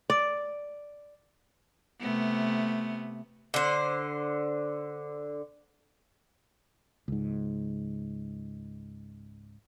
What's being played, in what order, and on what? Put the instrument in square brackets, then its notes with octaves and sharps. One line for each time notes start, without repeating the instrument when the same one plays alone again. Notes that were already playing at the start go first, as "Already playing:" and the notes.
[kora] D5
[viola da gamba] C3 A3 B3
[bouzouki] D3 C5
[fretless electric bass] C#2 G#2